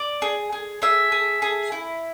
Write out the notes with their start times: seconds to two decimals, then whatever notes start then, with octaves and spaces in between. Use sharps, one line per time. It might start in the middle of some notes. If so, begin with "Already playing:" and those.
Already playing: D5
0.22 G#4
0.52 G#4
0.82 G#4 E5
1.12 G#4
1.42 G#4
1.72 E4